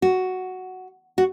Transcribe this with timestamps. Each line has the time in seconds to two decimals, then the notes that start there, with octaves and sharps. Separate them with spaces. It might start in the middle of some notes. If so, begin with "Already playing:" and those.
0.02 F#4
1.18 F#4